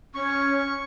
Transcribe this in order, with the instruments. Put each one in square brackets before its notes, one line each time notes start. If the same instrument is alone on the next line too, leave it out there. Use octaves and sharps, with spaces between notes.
[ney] C#4 [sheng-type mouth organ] C#6